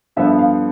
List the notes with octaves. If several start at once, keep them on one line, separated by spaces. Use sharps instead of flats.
G2 D3 F3 B3 E5
F5